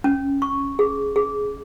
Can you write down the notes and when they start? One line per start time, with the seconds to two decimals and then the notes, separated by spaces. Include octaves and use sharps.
0.04 C#4
0.42 C#6
0.79 G#4
1.16 G#4